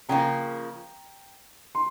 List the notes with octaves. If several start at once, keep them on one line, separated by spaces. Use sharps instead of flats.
C#3 F3 A#3 G5 A#5
C6